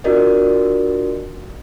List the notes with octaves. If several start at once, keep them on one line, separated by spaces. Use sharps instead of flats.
D4 F4 F#4 A#4 D5 D#5